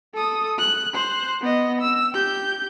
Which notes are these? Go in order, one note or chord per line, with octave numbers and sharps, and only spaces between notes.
A4 D#6
F#6
C5 F#6
B3 D#5
E6
G4 G6